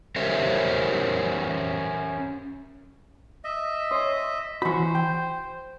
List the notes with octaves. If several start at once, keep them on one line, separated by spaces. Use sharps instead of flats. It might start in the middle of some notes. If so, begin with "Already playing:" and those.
C#4 G4 A#4 C5 C#5 E5
D#5 E5
C#5 C6 D#6
E3 F#4 C5 B5 C#6
G5